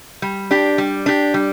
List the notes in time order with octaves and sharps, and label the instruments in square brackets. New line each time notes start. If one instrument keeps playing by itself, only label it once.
[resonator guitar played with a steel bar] G3
D4 G4
G3
D4 G4
G3